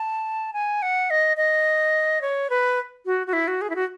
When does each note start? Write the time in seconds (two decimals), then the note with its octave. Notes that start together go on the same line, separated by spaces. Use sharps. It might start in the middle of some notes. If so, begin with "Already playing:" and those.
Already playing: A5
0.53 G#5
0.82 F#5
1.10 D#5
1.37 D#5
2.21 C#5
2.50 B4
3.06 F#4
3.27 F#4
3.33 E4
3.48 F#4
3.61 G#4
3.70 E4
3.76 F#4